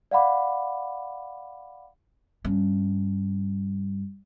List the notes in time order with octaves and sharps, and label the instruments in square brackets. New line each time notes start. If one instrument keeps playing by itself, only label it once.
[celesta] D5 F5 F#5 B5 D6
[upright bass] G2 C#4